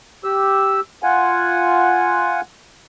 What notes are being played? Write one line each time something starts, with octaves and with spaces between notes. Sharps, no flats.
G4 E6
F4 F#5 G#5